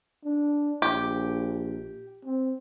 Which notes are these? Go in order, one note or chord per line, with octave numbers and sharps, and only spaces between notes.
D4
A#1 G4
C4